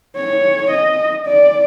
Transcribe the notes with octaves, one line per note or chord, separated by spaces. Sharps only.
C#5
D#5
D5